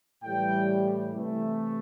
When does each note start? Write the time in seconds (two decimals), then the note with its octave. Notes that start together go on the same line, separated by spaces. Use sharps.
0.24 A2 E3 G3 G5
1.15 C3 E3 A3